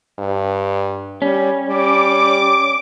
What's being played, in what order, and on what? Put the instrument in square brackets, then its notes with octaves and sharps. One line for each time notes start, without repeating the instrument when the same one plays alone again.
[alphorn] G2
[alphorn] G3 [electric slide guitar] C#4
[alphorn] G3 [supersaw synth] D6